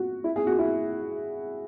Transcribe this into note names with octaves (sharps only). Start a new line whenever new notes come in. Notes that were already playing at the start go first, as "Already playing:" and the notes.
Already playing: F#4
E4
G#4
F#4
E4